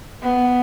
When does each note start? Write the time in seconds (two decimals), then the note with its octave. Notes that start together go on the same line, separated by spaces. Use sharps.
0.23 B3